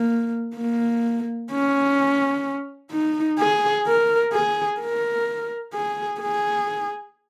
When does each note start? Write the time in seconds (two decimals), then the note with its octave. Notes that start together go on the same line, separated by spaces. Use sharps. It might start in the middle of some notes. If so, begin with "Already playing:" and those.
Already playing: A#3
0.57 A#3
1.52 C#4
2.92 D#4
3.39 G#4
3.87 A#4
4.33 G#4
4.81 A#4
5.74 G#4
6.21 G#4